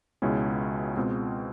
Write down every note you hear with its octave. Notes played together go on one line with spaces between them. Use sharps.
C#2 B2 G#3 C#4 E4
B2 G#3 C4 F4